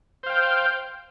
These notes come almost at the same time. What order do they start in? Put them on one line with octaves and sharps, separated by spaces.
C5 F5 G5